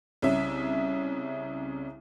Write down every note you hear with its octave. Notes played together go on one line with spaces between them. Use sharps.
C2 C#3 C#4 E5